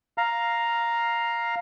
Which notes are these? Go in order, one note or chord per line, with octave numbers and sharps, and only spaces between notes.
F5 A#5